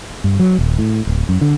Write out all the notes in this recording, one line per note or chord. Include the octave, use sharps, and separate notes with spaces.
G2
F#3
D#1
A2
D1
F#2
D3